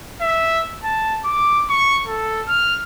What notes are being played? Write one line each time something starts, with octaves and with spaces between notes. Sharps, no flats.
E5
A5
D6
C#6
A4
F6